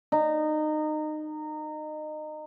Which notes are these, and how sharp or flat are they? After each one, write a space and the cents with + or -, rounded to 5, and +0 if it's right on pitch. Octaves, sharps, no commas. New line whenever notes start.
D#4 -25